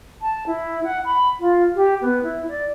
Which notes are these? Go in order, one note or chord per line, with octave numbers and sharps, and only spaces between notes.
A5
E4
F#5
B5
F4
G4
B3
E4
D5